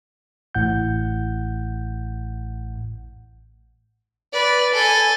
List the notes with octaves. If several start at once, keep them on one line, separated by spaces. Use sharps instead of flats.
A1 A2 F#5 G6
B4 D5
A4 G#5